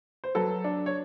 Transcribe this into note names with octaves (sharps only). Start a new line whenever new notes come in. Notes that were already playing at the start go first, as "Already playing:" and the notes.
C5
F#3 A4 B4
D4
C#5